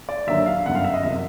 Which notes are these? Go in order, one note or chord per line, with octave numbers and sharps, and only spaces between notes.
D5
D#2 D3 F#3 E5
F5
G1 F#2 C#3 F#5
F5
E5
D#5
F#1 C3 F3 E5